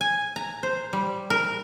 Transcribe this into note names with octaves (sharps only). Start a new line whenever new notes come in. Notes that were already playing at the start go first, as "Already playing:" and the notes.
G#5
A#5
C5
G3
A#4